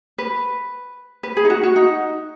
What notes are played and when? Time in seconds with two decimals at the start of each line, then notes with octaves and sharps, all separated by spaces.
0.18 B4
1.23 B4
1.37 G#4
1.45 D#4
1.50 F#4
1.63 F#4
1.76 D#4